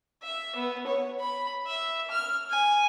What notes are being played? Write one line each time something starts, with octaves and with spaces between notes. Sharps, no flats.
E5
B3
C#5
B5
E5
F6
G#5